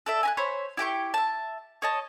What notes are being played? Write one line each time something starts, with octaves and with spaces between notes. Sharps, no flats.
A4 D5 E5
G#5 A#5 F#6
C5 C#5 B5
E4 G4 G5 C#6
E5 A5
C#5 D#5 A5